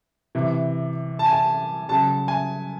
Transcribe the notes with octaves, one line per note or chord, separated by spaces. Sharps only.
C3 E3
A5
G#5
A5
C#3 F#3 A5
G#5